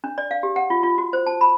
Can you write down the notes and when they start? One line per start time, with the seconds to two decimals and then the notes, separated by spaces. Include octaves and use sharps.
0.04 D4
0.18 D5
0.31 F5
0.43 G4
0.56 F#5
0.70 F4
0.83 F4
0.98 F#4
1.13 C5
1.26 A5
1.41 B5